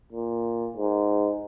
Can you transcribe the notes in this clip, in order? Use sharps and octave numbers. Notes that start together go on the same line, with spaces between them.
A#2
G#2